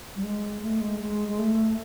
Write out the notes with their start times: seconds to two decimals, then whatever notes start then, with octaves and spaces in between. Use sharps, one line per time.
0.16 G3
0.24 G#3
0.62 A3
0.81 G#3
1.00 G#3
1.28 G#3
1.39 A3